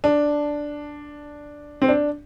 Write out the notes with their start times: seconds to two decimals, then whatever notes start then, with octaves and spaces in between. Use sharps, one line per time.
0.04 D4
1.82 C4
1.88 D4